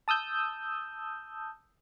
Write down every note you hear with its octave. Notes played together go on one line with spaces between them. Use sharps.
A5 D#6 E6 G6